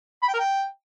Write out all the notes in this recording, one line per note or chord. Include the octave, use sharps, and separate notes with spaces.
B5
G5
A#4
G5